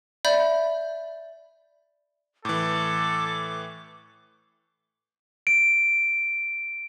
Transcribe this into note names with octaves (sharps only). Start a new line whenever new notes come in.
D5 E5 B5 G6
A2 E3 A4 D6
D7